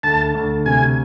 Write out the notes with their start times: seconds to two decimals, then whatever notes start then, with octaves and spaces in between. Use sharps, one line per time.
0.03 D2 A5
0.34 D2
0.66 C3 G#5